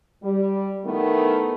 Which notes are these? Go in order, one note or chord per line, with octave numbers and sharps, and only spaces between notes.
G3
D#3 A3 B3 E4